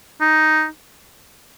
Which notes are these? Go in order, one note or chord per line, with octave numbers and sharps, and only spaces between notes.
D#4